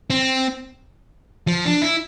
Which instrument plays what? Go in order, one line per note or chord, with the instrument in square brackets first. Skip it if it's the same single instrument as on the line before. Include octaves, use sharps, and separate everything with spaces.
[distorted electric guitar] C4
F3
D4
E4